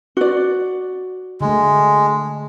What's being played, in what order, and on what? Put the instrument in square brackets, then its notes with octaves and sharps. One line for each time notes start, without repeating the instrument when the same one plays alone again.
[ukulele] F#4 D5
[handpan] D3 A3 [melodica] G#3